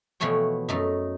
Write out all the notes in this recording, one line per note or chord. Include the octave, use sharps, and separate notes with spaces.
B2 E3 F3 A3 C#5 G5
F#2 A3 D#4